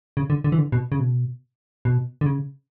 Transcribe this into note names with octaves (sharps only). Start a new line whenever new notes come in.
C#3
D3
D3
E3
D3
B2
C#3
B2
B2
D3
C#3